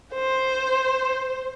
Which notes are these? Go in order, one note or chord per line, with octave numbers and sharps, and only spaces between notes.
C5